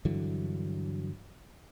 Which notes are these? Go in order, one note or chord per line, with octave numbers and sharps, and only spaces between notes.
G2 D3 E3 F#3